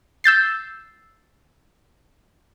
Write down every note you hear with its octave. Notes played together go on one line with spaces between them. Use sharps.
E6 G6 A6 C7